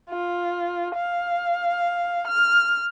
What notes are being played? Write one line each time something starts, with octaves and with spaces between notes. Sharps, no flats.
F4
F5
F6